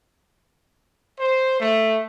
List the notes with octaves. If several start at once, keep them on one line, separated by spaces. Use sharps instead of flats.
C5
A3